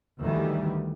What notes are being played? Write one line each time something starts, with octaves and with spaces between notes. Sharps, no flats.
D2 D#3 E3 G3